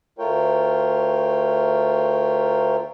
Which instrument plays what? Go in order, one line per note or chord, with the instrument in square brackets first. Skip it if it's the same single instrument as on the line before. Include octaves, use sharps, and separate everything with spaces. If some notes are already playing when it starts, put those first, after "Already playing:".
[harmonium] D2 A3 F4 A#4 C#5 G5